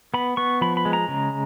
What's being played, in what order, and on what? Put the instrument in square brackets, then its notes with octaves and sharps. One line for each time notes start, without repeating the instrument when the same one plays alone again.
[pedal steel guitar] B3 B5
B3 C#6
F3 B5
B5
G#3
A#5
C#3